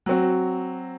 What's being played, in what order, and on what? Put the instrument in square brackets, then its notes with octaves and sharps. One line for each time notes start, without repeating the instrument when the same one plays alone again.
[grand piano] F#3 C4 F#4